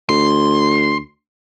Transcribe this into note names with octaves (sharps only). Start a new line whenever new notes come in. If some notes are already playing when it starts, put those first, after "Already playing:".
D2 C6